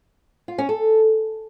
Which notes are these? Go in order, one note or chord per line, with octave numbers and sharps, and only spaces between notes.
F4
C#4
A4